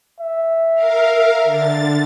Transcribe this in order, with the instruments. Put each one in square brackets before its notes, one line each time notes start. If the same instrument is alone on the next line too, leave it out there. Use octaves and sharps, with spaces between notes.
[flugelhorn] E5
[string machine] A#4 F5
D3 A6